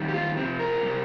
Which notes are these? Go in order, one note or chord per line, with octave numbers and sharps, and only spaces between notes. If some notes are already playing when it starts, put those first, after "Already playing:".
Already playing: F2 D#3 G3
G4
F4
C3 F3 C4
A#4
C3 G3